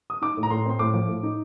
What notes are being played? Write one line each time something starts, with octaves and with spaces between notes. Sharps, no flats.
D#6
D#4 D6
A2
A#5
A2 C6
C4 C6
A2 D6
F3
A2
D#4